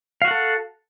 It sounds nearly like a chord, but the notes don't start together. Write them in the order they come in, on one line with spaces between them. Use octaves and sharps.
F5 F#4 F#5 A4